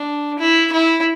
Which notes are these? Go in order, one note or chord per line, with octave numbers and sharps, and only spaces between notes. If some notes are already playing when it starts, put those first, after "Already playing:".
Already playing: D4
E4
E4